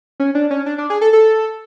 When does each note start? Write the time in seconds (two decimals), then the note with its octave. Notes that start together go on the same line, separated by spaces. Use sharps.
0.20 C#4
0.35 D4
0.51 C#4
0.66 D4
0.78 D4
0.90 G#4
1.01 A4
1.13 A4